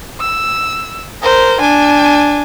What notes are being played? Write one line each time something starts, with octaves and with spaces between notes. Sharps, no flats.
E6
A#4 C5
D4 G#5